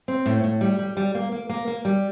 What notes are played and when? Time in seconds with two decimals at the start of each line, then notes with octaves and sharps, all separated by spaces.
0.08 C4
0.26 A2
0.44 A2
0.61 G3
0.79 G3
0.97 G3
1.15 A#3
1.32 A#3
1.49 A#3
1.67 A#3
1.85 G3